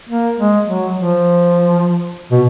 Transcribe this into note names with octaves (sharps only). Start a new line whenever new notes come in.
A#3
G#3
F#3
F3
B2